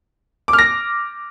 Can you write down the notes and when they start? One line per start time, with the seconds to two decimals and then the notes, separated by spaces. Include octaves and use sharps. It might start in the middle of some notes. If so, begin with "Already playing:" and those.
0.48 D6
0.53 F6
0.59 A#6